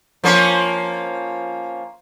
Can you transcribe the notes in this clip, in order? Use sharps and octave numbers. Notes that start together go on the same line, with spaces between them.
F3 A#3 C#4